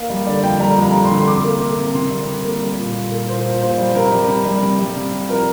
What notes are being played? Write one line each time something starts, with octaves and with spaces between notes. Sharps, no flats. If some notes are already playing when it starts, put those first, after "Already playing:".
Already playing: A#3 F5
G3 D5
D3 D5
F2 G5
G3 A#5
F2
A#5
G3
C6
D3
C6
C3 D6
A#3
C3
C3
C3 C6
G3
C3
A#3
G3
A#2
A#2
A#3
A#2 C5
A#2
A#2 C5
G3
C3 A#4
G3
C3
G3
C3
G3
C3
C3
F3 A#4